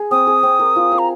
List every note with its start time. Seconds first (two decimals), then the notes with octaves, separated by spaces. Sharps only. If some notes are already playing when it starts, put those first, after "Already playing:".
Already playing: G#4
0.11 C4 D#6
0.27 G#4
0.43 C4
0.59 A#4
0.76 F4
0.92 F5
0.99 A#5